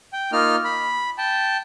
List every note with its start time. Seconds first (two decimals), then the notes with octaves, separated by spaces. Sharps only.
0.13 G5
0.33 A#3 D#4 F4 F6
0.65 B5
1.18 G5 A5